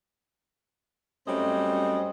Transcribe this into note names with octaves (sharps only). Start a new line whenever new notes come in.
F#2 G3 A3 C4 C#4 D#5